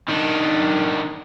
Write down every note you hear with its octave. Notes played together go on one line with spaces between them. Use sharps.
D#3 D4